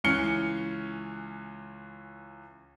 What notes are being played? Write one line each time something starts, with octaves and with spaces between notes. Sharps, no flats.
C#2 E3 C#4 F6 C#7 G7